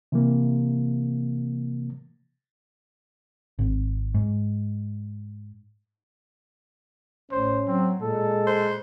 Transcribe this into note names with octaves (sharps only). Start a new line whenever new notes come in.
C3 E3 A#3
G#1
G#2
A1 C#4 C5
F#3 C4
A#2 G#3 A4
C5